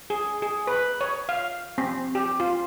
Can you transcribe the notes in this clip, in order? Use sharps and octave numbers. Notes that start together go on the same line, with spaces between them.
G#4
G#4
B4
C#5
F5
C4
G4
F4